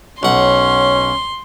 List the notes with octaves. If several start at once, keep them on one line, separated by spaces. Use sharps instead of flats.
B1 C#4 F#5 C6